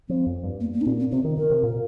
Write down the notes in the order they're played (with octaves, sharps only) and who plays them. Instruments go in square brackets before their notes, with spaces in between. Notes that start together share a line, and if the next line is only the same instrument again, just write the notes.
[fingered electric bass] F3 [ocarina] C4
[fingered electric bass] F2
G2
[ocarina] A#3
A#3
D#4
[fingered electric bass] A#2 [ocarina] C4
[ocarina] C4
[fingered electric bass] C3 [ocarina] C4
[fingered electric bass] D#3
[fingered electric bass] D#3 [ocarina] A#4
[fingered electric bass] C3
A#2